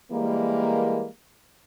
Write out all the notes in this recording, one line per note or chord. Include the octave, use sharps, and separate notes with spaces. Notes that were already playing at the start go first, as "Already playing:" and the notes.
E3 G3 G#3 A#3